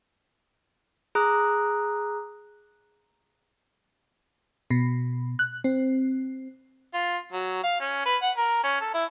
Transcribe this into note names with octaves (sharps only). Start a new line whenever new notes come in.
G#4 A#5 D#6 F#6
B2
F#6
C4
F4
F#3
F5
C#4
B4
F#5
A#4
C#4
A4
E4